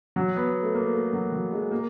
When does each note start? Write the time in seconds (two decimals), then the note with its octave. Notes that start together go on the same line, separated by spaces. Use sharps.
0.16 F#3
0.36 B3
0.63 A3
0.75 A#3
0.94 A3
1.13 F#3
1.32 F#3
1.52 G#3
1.71 A#3